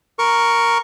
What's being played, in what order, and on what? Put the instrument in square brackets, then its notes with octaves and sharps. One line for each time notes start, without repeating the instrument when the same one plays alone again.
[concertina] A#4 C#6